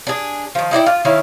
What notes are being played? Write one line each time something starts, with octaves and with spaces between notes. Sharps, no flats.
D4 G#4
D#3 F3
D#4 E4 D5 G5
F4
D#3 C#4 E4 F5